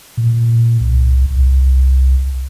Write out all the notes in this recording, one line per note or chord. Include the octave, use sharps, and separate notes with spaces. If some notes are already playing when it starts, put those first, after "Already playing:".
A#2
C2
C2